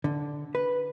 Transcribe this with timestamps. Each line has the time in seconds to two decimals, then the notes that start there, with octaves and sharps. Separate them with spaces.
0.04 D3
0.55 B4